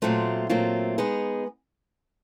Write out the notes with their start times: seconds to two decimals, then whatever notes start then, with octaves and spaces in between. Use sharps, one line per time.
0.02 A#2 F#3 A3 C4 F4
0.50 A#2 F#3 A3 C4 F4
0.98 G#3 B3 D#4 G#4